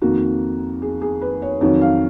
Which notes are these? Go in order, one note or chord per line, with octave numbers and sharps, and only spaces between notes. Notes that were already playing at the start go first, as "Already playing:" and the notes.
F2 D#3 A#3 F#4
G#4
G#4
B4
C#5
F2 D#3 F#3 C#5
F5